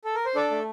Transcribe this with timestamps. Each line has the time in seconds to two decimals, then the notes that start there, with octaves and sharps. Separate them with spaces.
0.05 A4
0.15 A#4
0.26 C5
0.35 D4 A4 D5
0.51 A3